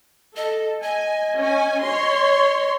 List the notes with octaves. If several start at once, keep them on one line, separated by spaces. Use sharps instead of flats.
A4 D#5
D#5 G#5
C#4 G#5
C#5 C6